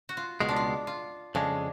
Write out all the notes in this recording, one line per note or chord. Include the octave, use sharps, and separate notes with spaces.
F#4
F4
C#2 B2 G#3 F4
D4
F4
F4
F2 C#3 G#3 D4